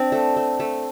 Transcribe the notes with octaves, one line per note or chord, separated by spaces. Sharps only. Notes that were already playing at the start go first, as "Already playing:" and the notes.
Already playing: C4 D4
A3
A3
A3